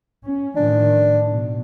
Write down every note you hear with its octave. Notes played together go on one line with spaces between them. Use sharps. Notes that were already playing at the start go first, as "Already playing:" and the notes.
C#4
A2 D#3 F3 D4
B2